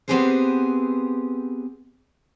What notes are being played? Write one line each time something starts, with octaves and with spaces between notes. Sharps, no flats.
B3 C4 G4 G#4 B4 C5